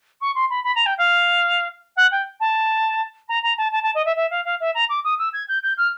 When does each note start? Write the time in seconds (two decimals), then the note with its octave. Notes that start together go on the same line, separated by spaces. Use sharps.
0.21 C#6
0.35 C6
0.49 B5
0.63 B5
0.75 A#5
0.86 G5
0.97 F5
1.96 F#5
2.11 G5
2.40 A5
3.28 A#5
3.43 A#5
3.57 A5
3.72 A5
3.83 A5
3.94 D#5
4.05 E5
4.16 E5
4.30 F5
4.44 F5
4.60 E5
4.74 A#5
4.89 D6
5.04 D#6
5.18 E6
5.33 G#6
5.48 G6
5.62 G6
5.77 F6